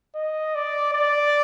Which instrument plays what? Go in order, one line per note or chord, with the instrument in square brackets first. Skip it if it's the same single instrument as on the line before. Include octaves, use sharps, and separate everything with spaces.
[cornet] D#5
D5
D5